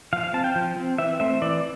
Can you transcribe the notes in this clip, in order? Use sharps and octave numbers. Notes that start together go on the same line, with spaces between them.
F3 F5
F5
C4 A5
G5
F3
C4
E3 E5
A3 C4 E5
E3 D5